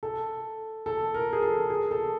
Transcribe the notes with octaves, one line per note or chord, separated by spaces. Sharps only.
A4
A4
A#4
G#4
A4
G#4
A4